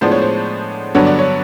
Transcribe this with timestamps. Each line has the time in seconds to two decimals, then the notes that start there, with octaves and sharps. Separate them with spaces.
0.01 A2 F3 G#3 B3 D4 C5
0.12 C#5
0.22 C5
0.95 G2 D3 F#3 B3 D4 C#5
1.07 D5
1.19 C#5